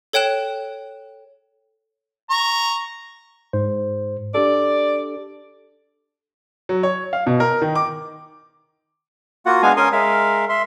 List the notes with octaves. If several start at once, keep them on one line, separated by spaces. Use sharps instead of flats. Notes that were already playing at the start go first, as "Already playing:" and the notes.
A4 C#5 G5 F#6 E7
A#5 C#6
G#2 C5
D4 G4 A4 D5
F#3
C#5
F5
B2
A#4
D#3
D6
A#3 F4 F#4 F#5
G#3 B3 D4 F5 G#5
C#4 A#4 G#5 C6 D#6
G#3 A#4 E5 F5
E5 C6